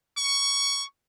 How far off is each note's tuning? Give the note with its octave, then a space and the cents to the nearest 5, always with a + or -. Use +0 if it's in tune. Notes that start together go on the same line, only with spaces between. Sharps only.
C#6 +10